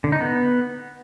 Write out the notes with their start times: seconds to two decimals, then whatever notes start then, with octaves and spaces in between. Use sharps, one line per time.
0.04 D3
0.12 D#4
0.21 B3